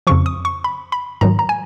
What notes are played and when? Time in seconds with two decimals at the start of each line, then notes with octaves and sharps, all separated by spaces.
0.07 F2 C#3 F3 C#6
0.26 D#6
0.45 C#6
0.64 B5
0.92 B5
1.21 G#2 D#3 F#3 A#5
1.39 A#5
1.49 G#5